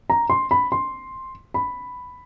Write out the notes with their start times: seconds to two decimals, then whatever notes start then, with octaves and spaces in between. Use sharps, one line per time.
0.10 A#5
0.30 C6
0.51 B5
0.72 C6
1.54 B5